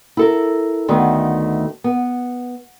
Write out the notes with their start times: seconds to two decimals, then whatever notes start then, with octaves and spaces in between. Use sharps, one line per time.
0.17 E4 A4 A#4
0.88 D2 D#3 A3 B3
1.84 B3